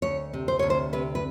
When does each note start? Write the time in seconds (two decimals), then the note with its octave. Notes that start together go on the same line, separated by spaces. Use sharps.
0.02 D2 C#5
0.33 C3
0.48 C5
0.59 D2 C#5
0.70 C5
0.93 C3 B4
1.15 B4